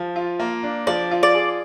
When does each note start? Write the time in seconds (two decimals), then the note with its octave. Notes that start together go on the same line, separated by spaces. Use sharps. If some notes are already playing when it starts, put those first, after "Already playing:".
Already playing: F3
0.16 F4
0.39 A#3
0.63 D4
0.87 F3 D5
1.11 F4
1.23 D5
1.34 G#4